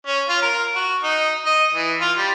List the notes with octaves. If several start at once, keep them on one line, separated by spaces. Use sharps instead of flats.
C#4
F4
A#4
F#4
D#4
D#5
E3
F4
G3